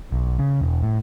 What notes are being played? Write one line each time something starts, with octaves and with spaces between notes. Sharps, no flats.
B1
C#3
E1
A2